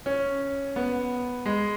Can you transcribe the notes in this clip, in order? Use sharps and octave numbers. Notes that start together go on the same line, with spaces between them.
C#4
B3
G#3